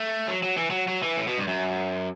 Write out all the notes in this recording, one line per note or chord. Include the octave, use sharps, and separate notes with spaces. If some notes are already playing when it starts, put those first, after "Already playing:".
Already playing: A3
F#3
F#3
E3
F#3
F#3
E3
A2
B2
G2
F#2